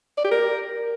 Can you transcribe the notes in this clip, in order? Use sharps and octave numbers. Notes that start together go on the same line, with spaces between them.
D5
G4
A#4